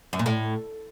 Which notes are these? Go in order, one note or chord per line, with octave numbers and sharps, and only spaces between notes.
F#2
A#2
A2